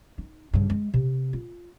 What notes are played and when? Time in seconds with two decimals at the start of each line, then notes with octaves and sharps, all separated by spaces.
0.18 D#4
0.54 G2 C#3
0.70 G#3
0.94 C3
1.33 F4